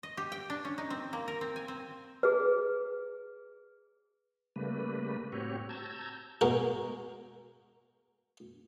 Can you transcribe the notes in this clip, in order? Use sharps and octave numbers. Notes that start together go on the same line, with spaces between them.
D#5
G4
G5
D4
C#4
D#4
C4
A#3
A#4
C4
G#5
C4
G#4 B4
C#3 G3 A3 A#3 B4
A2 C4 F#4 G4 C#5
A5 A#5 E6 G6 G#6
B2 G#3 A#4 F#5 C#6